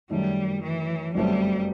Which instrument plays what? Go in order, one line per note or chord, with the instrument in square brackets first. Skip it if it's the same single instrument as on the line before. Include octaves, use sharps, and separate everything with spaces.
[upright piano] F#2 D#3 A3 D#4 [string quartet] G3
[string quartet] E3
[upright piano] G1 F#2 F#3 A3 C4 [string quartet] G3